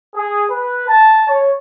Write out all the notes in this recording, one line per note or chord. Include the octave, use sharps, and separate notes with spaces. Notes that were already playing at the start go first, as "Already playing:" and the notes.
G#4
B4
A5
C#5